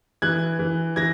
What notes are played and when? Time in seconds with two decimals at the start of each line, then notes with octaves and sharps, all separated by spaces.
0.22 E3 F#6 G#6
0.59 E3
0.96 E3 G#6 A#6